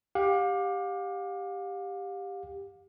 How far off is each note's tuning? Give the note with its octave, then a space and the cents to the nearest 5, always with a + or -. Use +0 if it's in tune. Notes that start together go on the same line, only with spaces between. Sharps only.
G4 +10 F5 +35